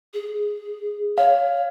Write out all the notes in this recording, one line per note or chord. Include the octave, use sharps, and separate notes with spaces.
G#4
C#5 F5